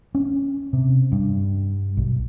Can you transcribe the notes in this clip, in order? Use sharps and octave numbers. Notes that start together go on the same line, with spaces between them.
C#4
C3
G2
B1